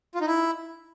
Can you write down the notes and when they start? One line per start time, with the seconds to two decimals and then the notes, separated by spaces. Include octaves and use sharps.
0.15 F4
0.21 D#4
0.27 E4